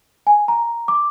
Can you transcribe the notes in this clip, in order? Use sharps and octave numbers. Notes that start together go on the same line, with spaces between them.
G#5
A#5
D6